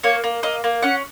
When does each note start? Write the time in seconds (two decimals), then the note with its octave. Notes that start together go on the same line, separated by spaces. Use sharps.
0.03 A#3 C#5
0.24 A#3
0.43 A#3 D#5
0.64 A#3
0.83 C#4 F#5